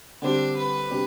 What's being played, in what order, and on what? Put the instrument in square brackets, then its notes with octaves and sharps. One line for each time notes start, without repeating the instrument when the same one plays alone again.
[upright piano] D3 G3 C4 G4 [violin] D4
[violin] B4
[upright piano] C3 G3 D4 G4